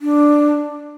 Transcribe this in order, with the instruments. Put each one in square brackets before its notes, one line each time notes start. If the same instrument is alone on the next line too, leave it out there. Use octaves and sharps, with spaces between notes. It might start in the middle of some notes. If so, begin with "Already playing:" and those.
[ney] D4